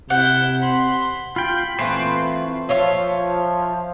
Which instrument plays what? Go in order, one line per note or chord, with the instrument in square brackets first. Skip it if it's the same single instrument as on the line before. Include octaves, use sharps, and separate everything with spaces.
[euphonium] C3 [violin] E4 G6 [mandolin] F#5
[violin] B5 C6
[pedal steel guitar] F4 G5 [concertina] B5
[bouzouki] E3 C4 B4 [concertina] A3 F4 [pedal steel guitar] C5
[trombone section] F3 [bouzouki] F4 C#5 E5